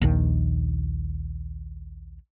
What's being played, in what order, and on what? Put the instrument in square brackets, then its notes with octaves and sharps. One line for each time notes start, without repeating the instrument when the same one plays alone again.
[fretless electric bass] A#1 D#2 D#3